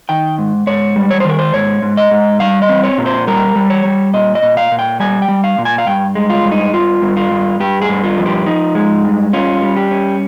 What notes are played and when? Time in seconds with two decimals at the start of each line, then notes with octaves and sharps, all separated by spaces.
0.09 D#3 G5
0.38 G#2
0.67 G#2 C#5
0.96 G3
1.11 C#5
1.20 C5
1.25 D#3 A#4
1.39 C5
1.54 G#2 C#5
1.82 G#2
1.97 D#5
2.11 G#2
2.40 G3 F5
2.62 D#5
2.69 C4
2.84 C#5
2.98 A#2
3.06 C5
3.27 G3 A#4
3.56 G3
3.70 C#5
3.85 G3
4.13 A#2 D#5
4.35 D#5
4.43 A#2
4.57 F5
4.71 A#2
4.79 G5
5.00 G3 G#5
5.22 G5
5.28 G3
5.44 F5
5.58 A#2
5.65 G#5
5.78 F5
5.87 G2 G5
6.15 G#3
6.30 F4
6.45 G2
6.52 D#4
6.74 G2 F4
7.02 G2
7.17 F4
7.31 G2
7.60 G2 G4
7.82 G#4
7.89 G2
8.03 F4
8.18 F3
8.26 G4
8.46 F3 D#4
8.75 G#3
9.05 G2
9.33 C#4 F4
9.62 G3
9.77 G4
9.91 C#4